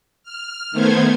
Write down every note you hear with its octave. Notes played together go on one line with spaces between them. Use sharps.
F6
D#3 A3 B3 C5 G#6